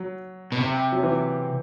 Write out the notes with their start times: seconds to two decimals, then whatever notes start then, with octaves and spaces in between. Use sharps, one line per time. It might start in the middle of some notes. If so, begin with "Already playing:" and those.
Already playing: F#3
0.52 B2
0.61 C3
0.92 F#3
1.03 E3